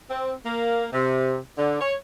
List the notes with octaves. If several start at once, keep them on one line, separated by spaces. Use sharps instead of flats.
C4
A#3
C3
D3
C#5